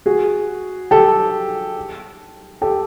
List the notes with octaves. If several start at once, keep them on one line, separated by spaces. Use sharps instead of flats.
F#4 G#4
G4 A4
G4 A4